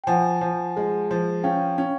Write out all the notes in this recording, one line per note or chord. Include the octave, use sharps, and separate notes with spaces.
G5
F3 F#5 G#5
F3
G#3
F3
C#4 F5 G5
C#4